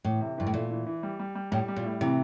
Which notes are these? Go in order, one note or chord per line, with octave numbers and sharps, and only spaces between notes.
A2 E3
C3
G2 E3
A2
A#2 A3
E3
E3
G3
G3
G3
A2 G3
G3
A#2
A2
C3 E3